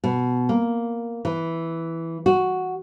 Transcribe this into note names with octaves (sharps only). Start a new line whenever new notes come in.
B2
A#3
E3
F#4